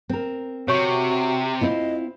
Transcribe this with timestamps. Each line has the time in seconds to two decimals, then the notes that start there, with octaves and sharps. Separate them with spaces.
0.09 C4 A#4
0.68 C3 F#4 C#5 C#6
1.61 C4 E4 F4 D#5